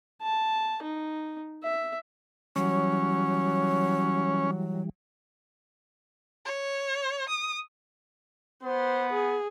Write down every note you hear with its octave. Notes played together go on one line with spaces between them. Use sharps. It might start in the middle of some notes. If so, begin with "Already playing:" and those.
A5
D#4
E5
E3 F#3 G3 C#4
C#5
D#6
B3 C5
G#4